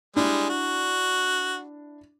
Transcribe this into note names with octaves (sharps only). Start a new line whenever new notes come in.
G3 G#3 D4 E4
F#4